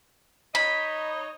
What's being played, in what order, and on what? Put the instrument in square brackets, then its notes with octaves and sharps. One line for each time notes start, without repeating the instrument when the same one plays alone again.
[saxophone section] D#4 C#5 D#5 [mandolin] B5